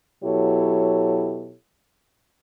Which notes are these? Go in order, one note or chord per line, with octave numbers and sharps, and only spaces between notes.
B2 F#3 E4 G4 A4 C#5